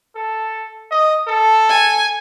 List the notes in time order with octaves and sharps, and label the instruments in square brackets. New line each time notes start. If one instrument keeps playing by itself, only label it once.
[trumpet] A4
D#5
A4
[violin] G#5